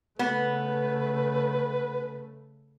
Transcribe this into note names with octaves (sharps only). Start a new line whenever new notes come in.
C#3 A3 B3 B4